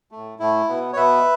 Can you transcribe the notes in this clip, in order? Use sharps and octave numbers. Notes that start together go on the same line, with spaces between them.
A3
A2
A2 A3 E4
B2 B3
C#5
B2 B3 B4 E5